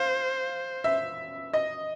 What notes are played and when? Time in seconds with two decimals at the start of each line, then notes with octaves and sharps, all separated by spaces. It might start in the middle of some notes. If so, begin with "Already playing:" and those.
Already playing: C5 F5
0.84 E5
1.53 D#5